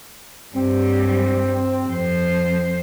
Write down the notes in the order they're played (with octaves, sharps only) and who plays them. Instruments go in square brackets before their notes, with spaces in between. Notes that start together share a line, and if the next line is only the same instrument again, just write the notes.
[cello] G2 G3 [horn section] C4
[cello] F2 C5